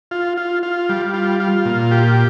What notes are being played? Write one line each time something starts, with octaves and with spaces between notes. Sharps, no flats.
F4
F4
F4
G3
F4
F4
A#2
G4